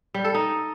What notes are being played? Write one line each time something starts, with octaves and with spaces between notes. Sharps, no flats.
G3
A4
D#4